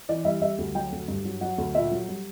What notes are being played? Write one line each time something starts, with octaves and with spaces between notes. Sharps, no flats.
E3 D5
G3 E5
G3 E5
D2
F#3 G5
D2
G2
F#3
F#3 F#5
D2
A#2 E5
F#3
G3